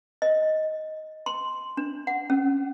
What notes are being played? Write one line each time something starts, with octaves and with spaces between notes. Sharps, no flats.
D#5
C6
D4
F#5
C#4